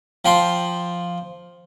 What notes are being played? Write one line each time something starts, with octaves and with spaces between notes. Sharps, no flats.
F3 G5 C6